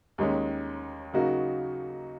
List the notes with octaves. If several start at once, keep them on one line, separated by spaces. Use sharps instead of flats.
D#2 D#3 G#3 C#4
C#3 F#3 A#3 D#4 F#4